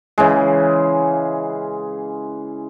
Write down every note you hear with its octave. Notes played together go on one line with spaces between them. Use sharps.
C#3 E3 G#3